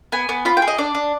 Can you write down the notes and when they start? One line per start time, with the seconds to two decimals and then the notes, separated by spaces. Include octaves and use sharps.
0.12 B3 G#5
0.29 B3
0.45 F4 B5
0.57 G5
0.62 G#4
0.68 D#5
0.78 D4 D5
0.95 D4